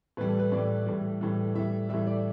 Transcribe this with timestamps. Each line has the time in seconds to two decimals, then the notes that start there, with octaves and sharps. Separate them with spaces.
0.17 A2 E3 G3 B4
0.28 A4
0.39 B4
0.52 A2 E3 G3 D5
0.87 A2 E3 G3
1.21 A2 E3 G3
1.55 A2 E3 G3 E5
1.89 G3 E5
1.92 A2 E3
2.07 D5